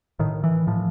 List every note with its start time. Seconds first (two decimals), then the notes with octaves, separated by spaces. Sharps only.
0.19 A2 D#3
0.44 E3
0.67 A2 F3